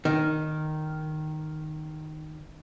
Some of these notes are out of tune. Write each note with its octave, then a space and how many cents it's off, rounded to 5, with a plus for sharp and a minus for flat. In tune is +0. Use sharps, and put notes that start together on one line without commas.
D#3 -10